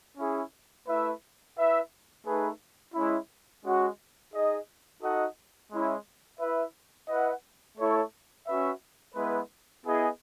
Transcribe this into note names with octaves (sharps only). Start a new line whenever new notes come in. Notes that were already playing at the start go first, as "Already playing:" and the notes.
C#4 E4 G#4
A3 E4 B4 E5
E4 B4 E5
A3 D#4 G#4 B4
G#3 C#4 E4
G#3 C#4 F#4
D#4 G#4 D#5
D#4 F#4 A4 D#5 F#5
G#3 C#4 E4
E4 B4 E5
E4 B4 D#5 F#5
A3 E4 A4 C#5
C#4 F#4 B4 E5
G#3 B3 E4 B4
B3 E4 G#4 D#5